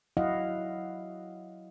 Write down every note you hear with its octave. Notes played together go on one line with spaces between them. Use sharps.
F#3 E4 F#4 D#5 F5 F#5